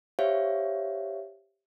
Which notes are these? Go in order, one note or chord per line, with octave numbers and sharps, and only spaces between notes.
G4 C5 C#5 E5 F5